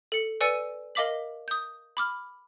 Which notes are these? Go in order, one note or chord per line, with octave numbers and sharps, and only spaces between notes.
A4 C#7
B4 D5 G#5 E6 C#7 D#7
A#4 D#5 F5 D6 B6 F#7
D#6 G6
B5 D6 F6